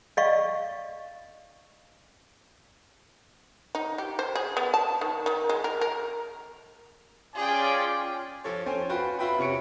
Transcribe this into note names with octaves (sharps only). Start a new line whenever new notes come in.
D5 D#5 F5 C#6
D#4
G4
C5
G#4
B3
A5
D#3
D#3
G#3
A#4
A#4
C#4 F4 G#4 D5 G5 G#5
F3 A4 C#5
C#4 C5 C#5 G5 G#5
F4 F#4 B4 G5
F4 F#4 B4 E5 G5 B5
C3 C#4 C#6 C#7 D7